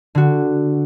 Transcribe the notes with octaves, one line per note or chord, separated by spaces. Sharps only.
D3 F#4